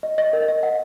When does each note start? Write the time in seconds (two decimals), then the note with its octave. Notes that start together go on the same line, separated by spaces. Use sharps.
0.03 D#5
0.18 D#5
0.33 A#4
0.48 D#5
0.63 F#5